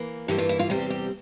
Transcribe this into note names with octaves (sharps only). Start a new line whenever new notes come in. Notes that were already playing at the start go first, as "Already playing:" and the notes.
Already playing: E3 A#3
G2 E3 A#3 G4
F4
E4
F4
E2 C3 G3 C4 G4
G4